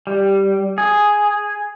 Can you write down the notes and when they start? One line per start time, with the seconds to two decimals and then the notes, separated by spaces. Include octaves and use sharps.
0.07 G3
0.78 G#4